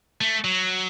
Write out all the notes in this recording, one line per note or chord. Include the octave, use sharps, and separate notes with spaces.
A3
F#3